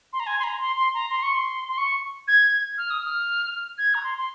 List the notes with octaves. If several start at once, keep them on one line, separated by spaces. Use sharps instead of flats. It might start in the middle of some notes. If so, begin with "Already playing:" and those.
C6
A#5
G#5
C6
A#5
C6
C6
A#5
C6
C#6
C6
C6
C#6
G#6
F6
D#6
F6
G#6
A#5
C6
C6